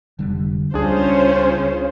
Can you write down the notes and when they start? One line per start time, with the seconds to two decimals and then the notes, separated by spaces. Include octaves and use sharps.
0.19 F1 D3 G3
0.74 C#2 G3 C#4 D4 F4 G#4 C5